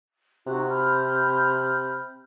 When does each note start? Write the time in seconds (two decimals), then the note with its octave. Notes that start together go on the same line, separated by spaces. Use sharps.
0.47 C3 D#4 F#4 F#6
0.70 B5 F6 G6